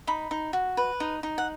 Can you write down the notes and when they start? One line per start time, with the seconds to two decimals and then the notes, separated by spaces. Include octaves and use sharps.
0.07 D#4 B5
0.31 D#4
0.53 F#4
0.77 B4
1.00 D#4
1.23 D#4
1.38 F#5